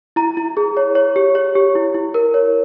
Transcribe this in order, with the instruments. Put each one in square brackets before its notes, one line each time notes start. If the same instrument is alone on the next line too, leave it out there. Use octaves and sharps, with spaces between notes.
[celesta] E4 A#5
E4
G#4
C#5
C#5
G4
C#5
G4
E4
E4
A#4
C#5